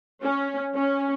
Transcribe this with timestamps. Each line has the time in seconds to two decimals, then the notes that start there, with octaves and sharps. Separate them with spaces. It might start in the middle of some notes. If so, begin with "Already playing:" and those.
0.22 C#4
0.74 C#4